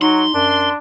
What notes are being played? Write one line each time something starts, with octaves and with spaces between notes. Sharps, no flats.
F#3 D#4 C6
F#2 D4